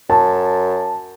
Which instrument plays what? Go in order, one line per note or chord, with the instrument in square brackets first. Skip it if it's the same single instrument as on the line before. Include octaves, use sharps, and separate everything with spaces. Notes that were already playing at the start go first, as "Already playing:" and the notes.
[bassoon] F#2 [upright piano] A5